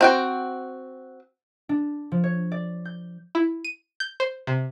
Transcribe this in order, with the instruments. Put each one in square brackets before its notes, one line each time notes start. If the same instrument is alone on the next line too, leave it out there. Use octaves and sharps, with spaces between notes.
[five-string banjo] C4 F#4 G5
[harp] D4
F3
C#5
D5
G6
[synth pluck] E4
D#7
G6
C5
C3